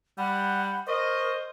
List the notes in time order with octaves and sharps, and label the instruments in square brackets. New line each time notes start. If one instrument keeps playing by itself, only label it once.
[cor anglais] G3 [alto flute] F#5 [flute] B5
[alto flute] A#4 [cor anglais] C5 [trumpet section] D#5 [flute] C#6